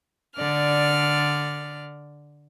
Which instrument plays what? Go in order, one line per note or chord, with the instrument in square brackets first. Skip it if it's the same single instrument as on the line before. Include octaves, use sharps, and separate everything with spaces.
[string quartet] D3 D5 F6